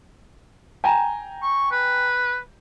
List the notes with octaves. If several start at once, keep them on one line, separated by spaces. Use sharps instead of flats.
G5 G#5 A#5
C#6
B4